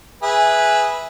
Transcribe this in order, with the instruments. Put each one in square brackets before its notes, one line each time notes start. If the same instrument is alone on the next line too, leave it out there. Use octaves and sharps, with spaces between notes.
[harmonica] G#4 B4 E5